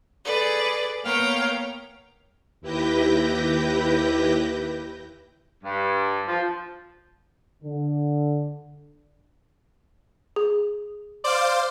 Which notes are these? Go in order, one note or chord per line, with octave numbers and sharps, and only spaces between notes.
G#4 A4 B4 D5
A#3 B3 C#5 F5 G5 A#5
D#2 E4 G4 B4 G6 A#6
G2
F3
D3
G#4
C5 D5 F5